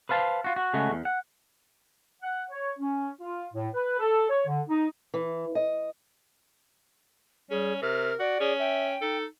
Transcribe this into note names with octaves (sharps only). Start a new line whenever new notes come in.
B4 C5 F5 A5
F4 F#4
F#4
C#3 G#3 A3 F#4
E2
F#5
F#5
C#5
C#4
F4
A2
B4
A4
C#5
D3
D#4
E3
D#5
G3 C#4 G#4
C3 A#4 F6
F#4 D5
C#4 G#4
E5 G5
D#4 A4